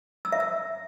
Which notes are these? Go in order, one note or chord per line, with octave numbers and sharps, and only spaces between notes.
E6
E5
E6